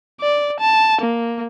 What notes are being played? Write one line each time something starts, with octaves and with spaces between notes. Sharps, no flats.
D5
A5
A#3